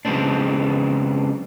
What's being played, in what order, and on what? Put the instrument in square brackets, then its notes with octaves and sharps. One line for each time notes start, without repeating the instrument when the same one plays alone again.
[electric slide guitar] C#3 F#3 G#3 B3 C4 D4